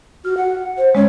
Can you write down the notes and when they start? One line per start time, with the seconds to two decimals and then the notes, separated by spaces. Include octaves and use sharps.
0.25 F#4 F6
0.37 F#5
0.78 C5
0.95 G#3 C#4 C#5